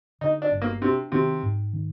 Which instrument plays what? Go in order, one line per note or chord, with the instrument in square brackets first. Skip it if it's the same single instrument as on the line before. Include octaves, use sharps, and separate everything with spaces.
[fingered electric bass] D3 [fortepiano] D#4
[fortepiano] D4
[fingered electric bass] G1
[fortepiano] A#3
[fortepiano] C3 [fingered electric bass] D4
[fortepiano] C3 [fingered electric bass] D#3
[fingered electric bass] G#2
D#3